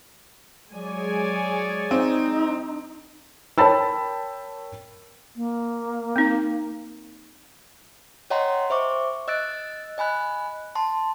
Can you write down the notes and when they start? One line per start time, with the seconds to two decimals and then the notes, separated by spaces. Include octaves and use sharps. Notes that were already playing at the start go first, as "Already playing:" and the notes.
0.74 F#3 G#3 G#4 C#5 D5 G#5
1.91 C4 D#4
3.58 A#4 C#5 G5 A5 B5 E6
5.36 A#3
6.16 C4 D#4
8.30 C#5 D#5 F#5 G5 A#5 C6
8.70 C5 E5 C#6 D6
9.28 D#5 E6 F#6 A6 D7
9.98 D#5 G#5 B5 F#6
10.75 A5 C6